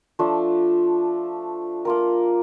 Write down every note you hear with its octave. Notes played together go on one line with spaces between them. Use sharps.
F3 A3 D4
A#3 F4 A#4